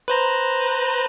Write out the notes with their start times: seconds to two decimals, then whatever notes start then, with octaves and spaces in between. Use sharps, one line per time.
0.08 B4 C5 A#5